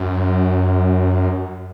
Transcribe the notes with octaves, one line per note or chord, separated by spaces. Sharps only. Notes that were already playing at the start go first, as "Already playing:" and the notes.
Already playing: F#2